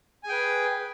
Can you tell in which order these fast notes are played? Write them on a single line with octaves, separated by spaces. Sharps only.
G#5 G#4 G5 B4